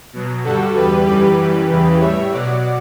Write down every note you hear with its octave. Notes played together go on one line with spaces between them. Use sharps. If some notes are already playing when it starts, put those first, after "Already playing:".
B2 F#3
G2 D3 G3 F#4 A4
E2 D3 G3 G4 B4
F#2 E3 G3 G4 B4
F#2 E3 G3
E2 C#3 E3
A2 G3 C#5 E5
B2 F#3 D5 F#5